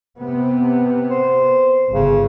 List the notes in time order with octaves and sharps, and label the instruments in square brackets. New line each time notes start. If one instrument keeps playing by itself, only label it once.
[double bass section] C3 B3
[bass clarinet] C5
[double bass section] G1 [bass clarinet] C#3